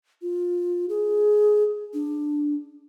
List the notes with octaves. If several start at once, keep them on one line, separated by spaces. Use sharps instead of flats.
F4
G#4
D4